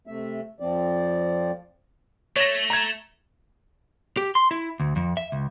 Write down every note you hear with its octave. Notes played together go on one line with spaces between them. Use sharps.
C3 A3 E5
F2 F3 C4 D5
A3 C#5 A#6
A#5 G#6
G4
C6
E4
D2
F2
E5
C#2